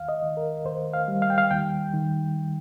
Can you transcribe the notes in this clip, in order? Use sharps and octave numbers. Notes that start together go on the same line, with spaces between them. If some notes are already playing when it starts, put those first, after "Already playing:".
Already playing: D#2 F5
D#5
D#3
A#4
D#2 C5
F5
G3
F5
G5
F5
D#2 G5
D#3